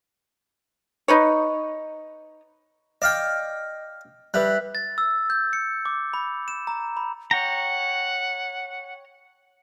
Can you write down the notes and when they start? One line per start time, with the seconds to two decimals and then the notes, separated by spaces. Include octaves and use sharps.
1.08 D#4 B4 C#5
3.02 D5 D#5 F5 G5
4.34 G3 B4 E5 F#6
4.75 A6
4.98 E6
5.30 G6
5.53 C#7
5.85 D6
6.14 B5
6.48 E7
6.67 A#5
6.97 B5
7.31 C#5 F#5 G5 A#5